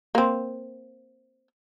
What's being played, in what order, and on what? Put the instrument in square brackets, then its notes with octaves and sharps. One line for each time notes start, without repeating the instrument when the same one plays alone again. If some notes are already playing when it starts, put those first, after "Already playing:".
[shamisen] A#3 C4